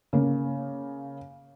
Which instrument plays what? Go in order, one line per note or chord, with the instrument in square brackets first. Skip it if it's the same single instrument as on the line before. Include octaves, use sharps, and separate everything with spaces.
[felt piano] C#3 A#3